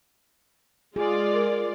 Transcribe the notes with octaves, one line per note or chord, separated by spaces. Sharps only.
G#3 F4 G#4 D5
A#4